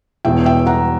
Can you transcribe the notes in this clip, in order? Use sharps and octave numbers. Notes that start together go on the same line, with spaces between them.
E1 E2 B2 E5 G5
E5 G5
F#5 A#5